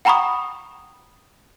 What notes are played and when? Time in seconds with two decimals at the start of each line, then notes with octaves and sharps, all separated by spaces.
0.05 F#5 G5 A#5 B5 C#6 D#6